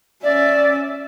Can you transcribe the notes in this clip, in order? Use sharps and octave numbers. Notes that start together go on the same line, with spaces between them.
C#4 D5 E5